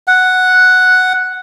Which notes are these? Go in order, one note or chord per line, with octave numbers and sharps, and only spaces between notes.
F#5